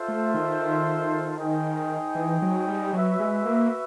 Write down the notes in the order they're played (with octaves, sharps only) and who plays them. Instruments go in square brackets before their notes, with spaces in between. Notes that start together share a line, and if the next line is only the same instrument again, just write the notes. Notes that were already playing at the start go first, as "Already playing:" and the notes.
Already playing: [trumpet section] F4 A4 C5 E5
[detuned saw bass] A3
D#3
[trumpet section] D#4 G#4 C5 D#5 G5
[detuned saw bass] E3
F#3
G3
[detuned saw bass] F#3 [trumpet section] F#4 B4 E5
[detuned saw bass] G#3
A#3